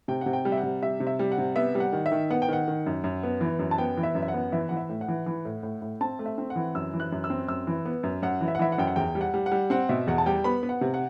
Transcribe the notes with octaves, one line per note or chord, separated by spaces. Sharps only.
C3 G5
C3 F#5
G5
G3
E5
F#5
C3
G3 E5
C3
E5
G3
F#5
C3
B3 E5
G3
F#5
D#3
E5
D#3
B3 F#5
G5
D#3 F#5
D#3
F#2
F#2
B3
E3
F#2
A5
B3 G5
E3
E5
F#2
E5
F#5
B3
E3 E5
E3 F#5
E5
A2
F#5
E3
E3
A2
A2
A2
C4 A5
A3
E5
C4
F#5
E3
F#2 E6
E3
F#6
F#2
E6
C4
F#2 E6
E3
B3
F#2
F#2 F#5
E3
E5
F#5
E3 E5
F#5
F#2 G5
F#5
E2 G5
G3
F#5
G3
F#5
G3
C4 F#5
B2 E5
E2 F#5
A5
G3 G5
B3 B5
B3
F#5
C3
F#5